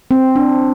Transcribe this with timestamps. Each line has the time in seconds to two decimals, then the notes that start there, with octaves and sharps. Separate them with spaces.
0.11 C4
0.36 D4